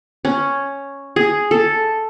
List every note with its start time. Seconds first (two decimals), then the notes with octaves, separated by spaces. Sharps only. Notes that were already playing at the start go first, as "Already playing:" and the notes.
0.25 C#4
1.16 G#4
1.51 A4